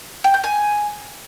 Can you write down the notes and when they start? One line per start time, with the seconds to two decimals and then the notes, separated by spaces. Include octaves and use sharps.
0.24 G5
0.34 G6
0.44 G#5